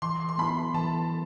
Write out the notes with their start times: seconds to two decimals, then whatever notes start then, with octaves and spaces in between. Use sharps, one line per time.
0.02 E3 C6
0.29 C6
0.38 B3 E4 B5
0.74 E3 A5